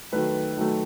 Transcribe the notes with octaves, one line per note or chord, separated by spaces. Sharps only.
D#3 F#3 A3 B4
D#3 F#3 A3